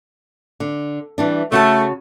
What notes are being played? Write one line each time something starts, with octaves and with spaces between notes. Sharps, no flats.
D3
E3 G3 D4
C#3 A3 F#4 A5